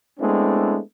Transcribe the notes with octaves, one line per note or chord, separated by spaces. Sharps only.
G#3 A3 B3 C4 D4 E4